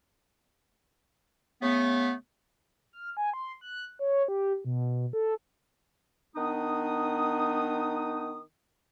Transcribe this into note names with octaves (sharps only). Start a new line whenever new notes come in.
C#3 A3 B3
F6
G#5
C6
F#6
C#5
G4
B2
A4
D#3 B3 D4 D#4 D#6